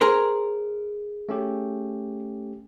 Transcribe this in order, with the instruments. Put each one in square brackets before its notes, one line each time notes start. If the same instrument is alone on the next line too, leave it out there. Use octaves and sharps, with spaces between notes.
[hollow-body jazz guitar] G#4 A#4 C5
[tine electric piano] A3 C#4 G4